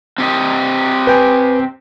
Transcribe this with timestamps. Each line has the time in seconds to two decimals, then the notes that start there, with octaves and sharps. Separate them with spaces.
0.18 C4 G4 D#5
1.07 B4 G5 G#5